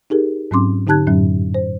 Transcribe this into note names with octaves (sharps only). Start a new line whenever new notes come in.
D#4 G4 G#4 A#4
G#2 F#3 C4 C#4 C6 D6
D3 D#4 G4 A5 F#6 G#6
F#2 A2 F#3 C#4
C5